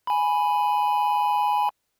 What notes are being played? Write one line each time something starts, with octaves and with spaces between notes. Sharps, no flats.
G#5 B5